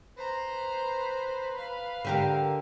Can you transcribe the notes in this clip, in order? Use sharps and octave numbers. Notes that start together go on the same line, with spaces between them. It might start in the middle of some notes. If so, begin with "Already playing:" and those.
B4 C5 A#5
F5
D3 G4 A#4